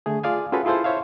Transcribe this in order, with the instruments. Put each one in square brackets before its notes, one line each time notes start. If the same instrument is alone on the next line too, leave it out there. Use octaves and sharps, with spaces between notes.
[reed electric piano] D3 A3 G#4
F4 G#4 D5 F5 G#5
C#4 F4 F#4 G#4 A4 B4
E4 F4 G#4 A4 C5
C5 C#5 E5 F5